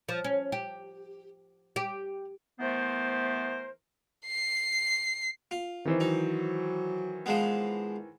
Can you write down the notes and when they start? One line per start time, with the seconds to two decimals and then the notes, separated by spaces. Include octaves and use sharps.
0.09 F3
0.24 C#4
0.52 G4
1.76 G4
2.60 E3 A3 B3 A#4 C5
4.26 C7
5.51 F4
5.85 C3 D#3 E3 C5
6.00 F#3 D#4
7.26 F3 G#3 B3